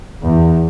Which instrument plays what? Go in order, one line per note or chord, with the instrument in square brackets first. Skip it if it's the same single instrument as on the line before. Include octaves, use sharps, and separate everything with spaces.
[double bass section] E2